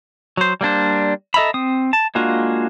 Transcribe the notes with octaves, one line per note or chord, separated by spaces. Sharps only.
F#3 C5
G3 A#3 D4 C5
A4 D#5 E5 A#5 B5
C4 D#6
A5
G#3 A#3 D4 F4 F#4